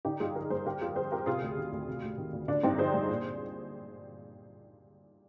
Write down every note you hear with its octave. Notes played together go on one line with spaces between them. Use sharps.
D3 D#4 G4
G2 F4 G#4
F3 G4 A#4
G2 G#4 C5
D3 G4 A#4
F2 F4 G#4
F3 G#4 C5
F2 G4 A#4
C3 F4 G#4
D2
D#3
D2
C3
D2
D#3
D2
D3 D4
G2 C4 D#4
F3 G#4 C5
G2
A#2